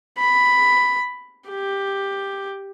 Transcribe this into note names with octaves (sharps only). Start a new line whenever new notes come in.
B5
G4